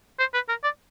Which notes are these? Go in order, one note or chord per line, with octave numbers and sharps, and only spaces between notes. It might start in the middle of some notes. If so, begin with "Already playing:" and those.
C5
B4
A#4
D5